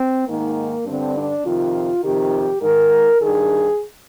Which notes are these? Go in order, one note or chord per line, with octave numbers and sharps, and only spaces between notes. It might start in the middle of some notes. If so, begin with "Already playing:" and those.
Already playing: C4
G#2 D#3 A#3
G2 D3 C4
D4
F2 C3 D#3 F4
F2 C3 D#3 G4
G#2 D#3 A#4
G2 D#3 G#4